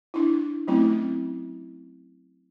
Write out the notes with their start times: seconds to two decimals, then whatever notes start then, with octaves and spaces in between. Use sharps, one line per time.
0.14 D4 E4
0.68 F#3 A3 C4 C#4 E4